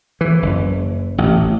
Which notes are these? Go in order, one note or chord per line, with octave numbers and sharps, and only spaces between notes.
E3
F#1
A1